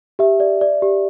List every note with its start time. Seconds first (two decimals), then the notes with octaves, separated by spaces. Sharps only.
0.19 G4 E5
0.40 D5
0.61 D5
0.82 G4